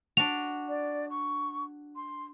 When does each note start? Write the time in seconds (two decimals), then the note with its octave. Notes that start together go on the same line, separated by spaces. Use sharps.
0.17 D4 F#4 F7
0.68 D5
1.10 C#6
1.96 C6